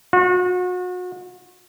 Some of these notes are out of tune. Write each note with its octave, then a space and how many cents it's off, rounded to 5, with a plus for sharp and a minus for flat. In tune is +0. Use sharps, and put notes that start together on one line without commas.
F#4 -35